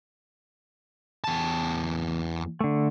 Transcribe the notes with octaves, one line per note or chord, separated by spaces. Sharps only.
E2 A5
D3 A3